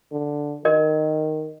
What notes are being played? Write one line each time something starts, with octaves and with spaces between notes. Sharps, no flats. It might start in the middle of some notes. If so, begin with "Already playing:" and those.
D3
D#3 A#4 D#5